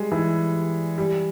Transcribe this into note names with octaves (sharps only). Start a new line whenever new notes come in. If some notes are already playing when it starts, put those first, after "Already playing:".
Already playing: G3 G#3
E3
G3